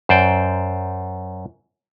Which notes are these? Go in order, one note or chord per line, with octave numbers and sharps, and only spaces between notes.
F#2 C5 D5 G5